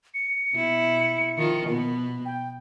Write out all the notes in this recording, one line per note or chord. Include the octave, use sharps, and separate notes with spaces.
C#7
B2 E4
D#3 F3 F4
B2 B3
G5